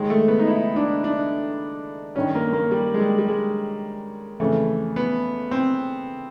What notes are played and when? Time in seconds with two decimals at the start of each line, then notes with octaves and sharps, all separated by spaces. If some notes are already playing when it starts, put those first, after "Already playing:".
Already playing: D#2 D#3 G#3
0.10 A3
0.28 B3
0.39 D#4
0.48 E4
0.76 D4
1.04 D4
2.15 G2 D#3 C#4
2.35 A#3
2.53 A#3
2.71 G3
2.94 G#3
3.00 G3
3.18 G3
3.28 G#3
4.40 F2 C#3 E3 A3
4.96 B3
5.51 C4